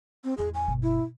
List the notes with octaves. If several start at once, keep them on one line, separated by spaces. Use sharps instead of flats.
C4
E2 A2 G#4
G#5
G1 B2
E4